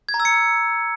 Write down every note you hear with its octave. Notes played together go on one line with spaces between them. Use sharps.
G#6
A#5
E6
C#7